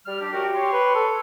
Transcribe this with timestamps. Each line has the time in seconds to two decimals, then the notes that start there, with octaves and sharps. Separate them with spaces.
0.06 G3 F6
0.20 D4 G4
0.32 F#2 F#4 G4 A#4
0.54 C#5 C6
0.73 B4
0.95 A4